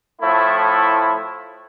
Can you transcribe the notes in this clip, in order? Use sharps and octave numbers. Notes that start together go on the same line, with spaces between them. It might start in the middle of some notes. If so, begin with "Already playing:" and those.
A2 F3 A3 E4